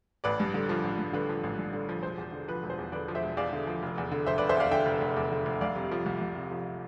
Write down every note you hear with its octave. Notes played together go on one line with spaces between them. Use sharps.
A1 B4 D5
G2
D3
F3
A1
G2
D3 B4
F3
A1
G2
D3
F3
E1 C5
E2
D3
F3 B4
E1
C5
E2
D3 B4 D5
F3
C5 E5
E1
E2 D5 F5
D3
F3
F1
E2
D3
F1 C5 E5
F1 B4 D5
C5 E5
E2 D5 F5
D3 E5 G5
F1
F1
E2
D3
F1
C2 D5 F5
C3
F3
C2
C2
C3
F3